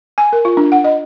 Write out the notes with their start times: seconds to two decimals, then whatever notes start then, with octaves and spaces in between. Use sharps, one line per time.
0.18 G#5
0.33 A#4
0.45 F4
0.57 D4
0.72 F#5
0.84 D#5